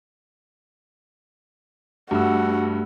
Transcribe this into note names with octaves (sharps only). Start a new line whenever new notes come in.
G2 A3 F#4 G4 E6